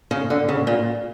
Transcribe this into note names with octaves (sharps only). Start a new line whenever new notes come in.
C#3
D3
C#3
A#2